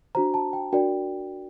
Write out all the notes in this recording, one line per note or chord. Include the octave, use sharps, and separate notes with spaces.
D4 F#4 C5 A#5
A5
G5
D4 F#4 A#4 D5 G5